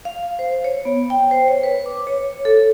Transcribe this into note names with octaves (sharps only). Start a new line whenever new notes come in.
F5
C5
C#5
B3
G5
C5
C#5
B4
D6
C#5
A4